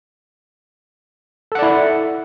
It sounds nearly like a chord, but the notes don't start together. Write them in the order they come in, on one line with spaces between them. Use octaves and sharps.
A4 F#5 D5 E4